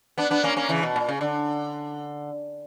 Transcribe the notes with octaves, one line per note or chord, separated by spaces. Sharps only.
B3 D4
B3 D4
A#3 C#4
A#3 C#4
C#3 E3
B2
A#2
C#3
D3